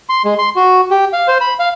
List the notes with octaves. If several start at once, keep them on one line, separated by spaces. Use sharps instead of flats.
C6
G#3
C6
F#4
G4
F5
C5
B5
F5